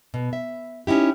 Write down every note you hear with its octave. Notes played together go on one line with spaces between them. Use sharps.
B2
E5
C#4 D#4 E4 G4